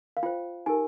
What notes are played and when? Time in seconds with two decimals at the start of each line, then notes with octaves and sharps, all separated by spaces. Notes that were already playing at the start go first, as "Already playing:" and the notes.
0.17 F5
0.23 F4 C5 G5
0.66 D#4 G4 A#4 G#5